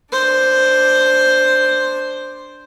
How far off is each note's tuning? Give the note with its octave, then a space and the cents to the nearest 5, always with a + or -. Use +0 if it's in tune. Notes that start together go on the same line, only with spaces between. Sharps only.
D4 +0 C5 +0